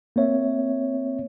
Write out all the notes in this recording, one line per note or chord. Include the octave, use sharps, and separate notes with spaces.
A#3 C4 C#5 E5